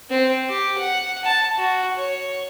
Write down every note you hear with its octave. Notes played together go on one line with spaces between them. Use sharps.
C4
G4
F#5
A5
F#4
C#5